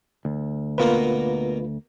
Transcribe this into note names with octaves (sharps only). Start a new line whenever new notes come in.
D2
B2 A#3 B3 F4 B4